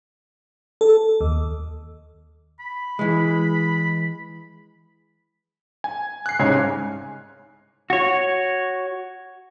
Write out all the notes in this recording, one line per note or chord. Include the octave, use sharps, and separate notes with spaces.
A4
D#2
B5
E3 G#3
G#5
F#6 C7
C2 G#2 C#3 C#5 G#5
F#4 C#5